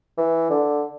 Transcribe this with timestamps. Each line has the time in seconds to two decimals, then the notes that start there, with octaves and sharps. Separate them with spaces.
0.17 E3
0.50 D3